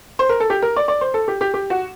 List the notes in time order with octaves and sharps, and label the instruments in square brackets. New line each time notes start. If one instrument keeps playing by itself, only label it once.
[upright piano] C5
A#4
A4
G4
A#4
D5
D5
C5
A4
G4
G4
G4
F#4